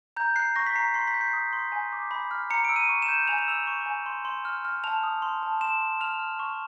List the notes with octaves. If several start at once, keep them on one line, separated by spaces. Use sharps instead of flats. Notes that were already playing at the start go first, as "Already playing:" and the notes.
A#5 G6
F#6 C7
C#6 A#6
B6
A#5 C7
C6 C7
B6
G6
C7
D#6
C6
G#5
D6
B5
F6
A#5 C#7
E6 D7
D#7
C#6
E7
G6
G#5 F7
E7
E6 F7
C#6
G#5
C6
C6
F6
F6
A5 F7
D#6
C6
A5
C6 E7
C6
F6 F7
F6
C#6